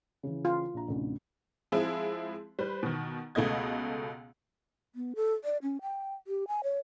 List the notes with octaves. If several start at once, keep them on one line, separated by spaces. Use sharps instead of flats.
C#3 E3
F4
A#1 A#5
A1 D2 C3
F3 G#3 C4 E4 G#4
G3 B4 C5
B2 D#3
C#2 B2 A3 B3 D#5 G#6
B3
A4
D5
C#4
G5
G4
G#5
C#5